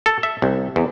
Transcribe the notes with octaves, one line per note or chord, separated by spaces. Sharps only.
A4
E5
C2
E2